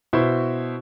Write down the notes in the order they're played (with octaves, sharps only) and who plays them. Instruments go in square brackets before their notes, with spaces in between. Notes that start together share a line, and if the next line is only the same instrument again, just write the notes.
[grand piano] B2 E4 C5 C#6